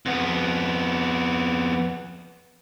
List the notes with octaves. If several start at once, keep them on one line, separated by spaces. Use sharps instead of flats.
F2 B3